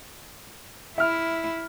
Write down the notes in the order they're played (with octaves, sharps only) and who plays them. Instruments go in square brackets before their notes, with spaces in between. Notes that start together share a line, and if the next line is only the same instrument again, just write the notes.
[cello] E4 [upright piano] E5 F6